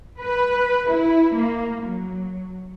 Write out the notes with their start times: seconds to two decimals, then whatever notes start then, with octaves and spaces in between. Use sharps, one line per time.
0.20 B4
0.89 E4
1.34 A#3
1.83 F#3